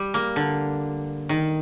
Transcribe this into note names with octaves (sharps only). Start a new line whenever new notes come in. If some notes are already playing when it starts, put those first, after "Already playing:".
Already playing: G3
A#3
D3
D#3